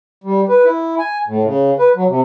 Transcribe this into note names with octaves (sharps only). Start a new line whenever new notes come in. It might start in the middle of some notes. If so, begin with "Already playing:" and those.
G3
B4
E4
G#5
A2
C#3
B4
F#3
C3